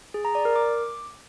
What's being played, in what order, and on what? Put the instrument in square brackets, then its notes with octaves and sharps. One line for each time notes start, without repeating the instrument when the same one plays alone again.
[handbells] G#4
A#5
D5
A#4
D6